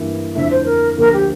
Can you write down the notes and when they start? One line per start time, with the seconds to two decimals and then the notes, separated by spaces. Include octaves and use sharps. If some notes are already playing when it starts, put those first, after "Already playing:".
Already playing: G2 E3 A#3 E4
0.34 F2 D3 A3 E4 E5
0.50 C5
0.66 A#4
0.98 D2 D3 F3 A#3 A#4
1.13 G4